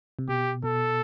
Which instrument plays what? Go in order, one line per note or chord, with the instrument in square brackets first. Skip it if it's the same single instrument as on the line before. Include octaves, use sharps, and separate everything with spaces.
[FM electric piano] C3
[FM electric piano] B2 [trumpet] G4
[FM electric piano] B2 [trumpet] A4